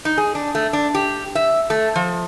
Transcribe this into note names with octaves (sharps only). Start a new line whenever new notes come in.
D#4
G#4
D4
A3
D4
G4
E5
A3
F3